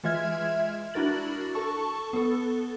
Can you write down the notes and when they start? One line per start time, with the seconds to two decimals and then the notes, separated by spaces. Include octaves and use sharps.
0.04 E3 G#3 F4 E5 F6 G#6
0.94 D4 E4 F#4 A#4 A6 F#7
1.55 A4 A5 C#6
2.13 B3 A4